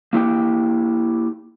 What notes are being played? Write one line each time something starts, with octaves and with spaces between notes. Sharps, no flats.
A#3 E4 G4 G5